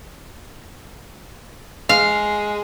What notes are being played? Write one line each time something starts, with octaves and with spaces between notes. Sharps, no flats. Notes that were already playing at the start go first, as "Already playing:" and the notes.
G#3 F5